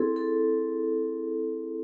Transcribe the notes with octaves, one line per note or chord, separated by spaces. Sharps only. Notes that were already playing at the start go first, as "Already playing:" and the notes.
Already playing: C4 E4 G#4 A4
A4